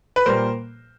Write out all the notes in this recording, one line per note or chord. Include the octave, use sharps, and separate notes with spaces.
B4
A#2 G3 A#3 A#4 C5